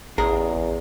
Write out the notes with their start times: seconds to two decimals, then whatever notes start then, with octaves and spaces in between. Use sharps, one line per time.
0.18 A1 E2 G#4 A#5